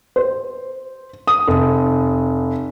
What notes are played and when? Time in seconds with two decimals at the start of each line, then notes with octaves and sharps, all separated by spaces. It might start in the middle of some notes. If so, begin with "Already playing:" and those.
0.16 C5
1.27 D#6
1.47 F1